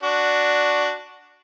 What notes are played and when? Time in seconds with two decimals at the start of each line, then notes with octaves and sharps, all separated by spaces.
0.03 D4 F#4